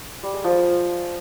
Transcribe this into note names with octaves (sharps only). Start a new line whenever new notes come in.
G3
G#3
F3